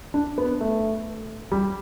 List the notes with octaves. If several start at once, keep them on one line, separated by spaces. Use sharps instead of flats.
D4
B3
A3
G3